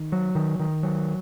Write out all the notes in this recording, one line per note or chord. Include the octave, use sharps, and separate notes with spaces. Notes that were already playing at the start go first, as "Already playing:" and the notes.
Already playing: D#3
F#3
D#3
D#3
F#3